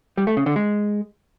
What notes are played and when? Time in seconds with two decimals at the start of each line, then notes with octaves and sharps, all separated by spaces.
0.17 G3
0.27 A3
0.37 C#3
0.46 D3
0.56 G#3